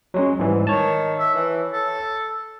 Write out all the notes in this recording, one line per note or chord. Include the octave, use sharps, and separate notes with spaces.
F#3 G#3 C#4
G#2 E3 G3
D#3 C#5 A5
E5
E3
A4